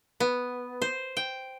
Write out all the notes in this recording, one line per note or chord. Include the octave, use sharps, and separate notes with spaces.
B3
C5
G5